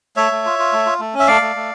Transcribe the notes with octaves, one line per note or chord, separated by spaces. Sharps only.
A3 C#5 E5
A3
F4
F4
A3
F4
A3
C#4
E5
A3 D5 F5
A3
A3